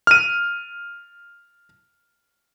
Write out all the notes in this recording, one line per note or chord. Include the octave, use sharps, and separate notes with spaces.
F6 D#7